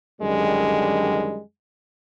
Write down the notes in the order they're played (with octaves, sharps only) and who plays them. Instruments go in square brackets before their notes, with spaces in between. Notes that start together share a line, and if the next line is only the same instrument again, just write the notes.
[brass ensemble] F#2 D3 D#3 G3 G#3